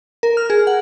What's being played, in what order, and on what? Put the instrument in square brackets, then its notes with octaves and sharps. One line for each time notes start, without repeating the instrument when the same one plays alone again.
[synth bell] A#4
F6
G#4
F#5